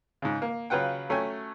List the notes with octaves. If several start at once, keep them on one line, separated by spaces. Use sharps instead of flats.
G#2 C#3
A#3
C#3 F#3 F4 B4 F#5 G5
F#3 A3 C#4 G5 G#5